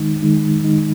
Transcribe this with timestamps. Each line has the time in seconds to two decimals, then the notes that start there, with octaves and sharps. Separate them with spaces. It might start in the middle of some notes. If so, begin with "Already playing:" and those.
Already playing: D#3 G#3 D#4
0.23 D#3 G#3 D#4
0.63 D#3 G#3 D#4